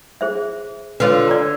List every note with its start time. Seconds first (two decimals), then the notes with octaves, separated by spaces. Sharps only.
0.21 G#4 C5 E5
1.00 D3 F4 B4 C#5
1.28 D5 A#5